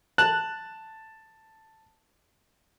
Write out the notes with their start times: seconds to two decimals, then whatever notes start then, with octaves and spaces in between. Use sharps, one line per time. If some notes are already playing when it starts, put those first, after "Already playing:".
0.18 A5 F#6